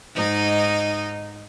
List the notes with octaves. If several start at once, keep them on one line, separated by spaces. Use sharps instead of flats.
G#2 D#4 D#5